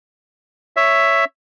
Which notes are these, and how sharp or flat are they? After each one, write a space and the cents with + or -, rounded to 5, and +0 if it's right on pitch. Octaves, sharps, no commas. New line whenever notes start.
C#5 +0 E5 +5